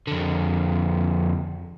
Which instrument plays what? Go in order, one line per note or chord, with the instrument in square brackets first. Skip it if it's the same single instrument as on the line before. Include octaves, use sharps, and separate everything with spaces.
[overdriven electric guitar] F2 D3